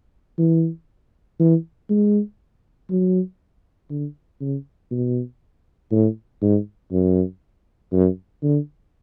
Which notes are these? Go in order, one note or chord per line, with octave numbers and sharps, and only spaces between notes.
E3
E3
G#3
F#3
D3
C#3
B2
A2
G#2
F#2
F#2
D3